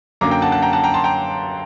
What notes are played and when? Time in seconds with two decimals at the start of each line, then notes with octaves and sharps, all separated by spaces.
0.21 F#2 D3 F#3 A#3 A#5 D6
0.31 G5 A#5
0.42 F#5 A5
0.52 F#5 A5
0.62 G5 A#5
0.73 F#5 A5
0.84 G5 A#5
0.94 A5 C6
1.04 G5 A#5